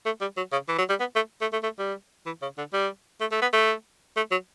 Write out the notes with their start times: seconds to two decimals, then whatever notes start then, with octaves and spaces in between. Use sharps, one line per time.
0.06 A3
0.21 G3
0.37 F#3
0.52 C#3
0.69 E3
0.79 F#3
0.90 G3
1.00 B3
1.16 A3
1.42 A3
1.53 A3
1.63 A3
1.79 G3
2.26 E3
2.42 C#3
2.58 D3
2.73 G3
3.21 A3
3.32 A3
3.42 B3
3.53 A3
4.17 A3
4.32 F#3